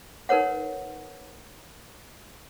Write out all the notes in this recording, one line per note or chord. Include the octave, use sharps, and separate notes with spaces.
D#4 A#4 B4 C#5 F#5